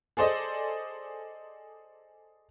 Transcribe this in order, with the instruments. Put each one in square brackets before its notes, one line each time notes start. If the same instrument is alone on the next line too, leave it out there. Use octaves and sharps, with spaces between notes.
[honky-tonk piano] G#4 A4 C5 D5 D#5